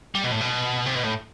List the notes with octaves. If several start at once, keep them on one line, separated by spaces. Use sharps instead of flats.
G3
B2
A2
B2
C3
B2
A2